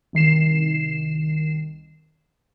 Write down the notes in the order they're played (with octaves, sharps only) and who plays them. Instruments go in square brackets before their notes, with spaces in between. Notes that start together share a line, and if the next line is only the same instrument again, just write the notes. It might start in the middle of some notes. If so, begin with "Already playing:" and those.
[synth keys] C2 D#3 C7 E7